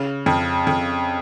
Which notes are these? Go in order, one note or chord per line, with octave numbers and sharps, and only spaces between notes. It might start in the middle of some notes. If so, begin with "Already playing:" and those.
Already playing: C#3
F2
F2